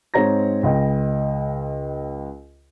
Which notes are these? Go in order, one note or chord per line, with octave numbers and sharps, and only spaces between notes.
G#2 G#3 C4 C#5 A#5 A#6
C#2 D#5 G5